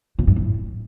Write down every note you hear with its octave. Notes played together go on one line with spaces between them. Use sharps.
A#2
G2
A2